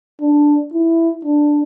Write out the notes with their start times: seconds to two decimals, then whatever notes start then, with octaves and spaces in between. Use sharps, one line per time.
0.21 D4
0.73 E4
1.25 D4